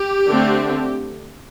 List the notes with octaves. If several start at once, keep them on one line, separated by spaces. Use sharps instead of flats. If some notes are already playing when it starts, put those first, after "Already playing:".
Already playing: G4
D3 A3 C4